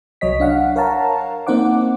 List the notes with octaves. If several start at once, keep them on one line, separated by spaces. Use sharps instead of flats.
C2 F#3 C#5 D#5 B6
D4 F5 F#5
A#4 C#5 F5 F#5 A5 A#5
A#3 C4 D#4 C5 F#5 D6